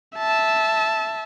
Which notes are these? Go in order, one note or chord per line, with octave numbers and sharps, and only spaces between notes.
E5 A5